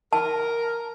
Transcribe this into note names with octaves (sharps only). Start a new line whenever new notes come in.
A#4 A5